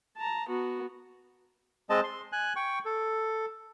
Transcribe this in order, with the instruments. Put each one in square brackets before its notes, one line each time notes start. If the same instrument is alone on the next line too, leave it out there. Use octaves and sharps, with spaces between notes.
[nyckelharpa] A5 A#5
B3 F#4
[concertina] G#3 C4 D#5 A5
C6
G#5 F#6
G5 C#6
A4